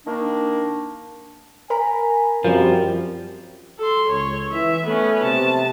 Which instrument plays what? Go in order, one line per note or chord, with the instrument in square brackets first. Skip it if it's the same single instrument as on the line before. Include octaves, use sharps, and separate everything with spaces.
[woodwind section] D#3 A#3 D4
[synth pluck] A#4 A#5 B5 [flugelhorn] G#5
[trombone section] F#2 G3 [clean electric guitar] F3 [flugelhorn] C4 [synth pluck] A#4 C5
[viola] A4 C6
[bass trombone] C#2 [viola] C#5
[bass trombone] E3 [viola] E5
[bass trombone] A3 [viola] B3 C#4
[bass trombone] C3 [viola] A5